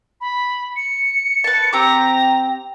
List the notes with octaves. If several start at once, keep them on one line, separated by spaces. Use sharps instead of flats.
B5
C#7
B4 A5
C4 G4 A#5 D6